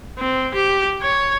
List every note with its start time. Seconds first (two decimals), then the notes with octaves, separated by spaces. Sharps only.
0.19 C4
0.54 G4
1.02 C#5